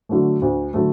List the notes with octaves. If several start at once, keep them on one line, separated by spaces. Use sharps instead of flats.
D3 F#3 A3
D2
D3 F#3 A3